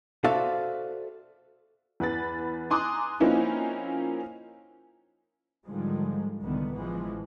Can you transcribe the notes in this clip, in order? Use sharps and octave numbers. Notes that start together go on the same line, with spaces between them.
F#4 A4 C5 D5 E5 F5
E2 B4 B5 A6
G#5 A#5 C6 D6 D#6 F#6
F3 A#3 C4 C#4 D#4 E4
G#2 D3 D#3 F3 G3 G#3
C2 D3 D#3 G3 B3
A1 E3 F3 G#3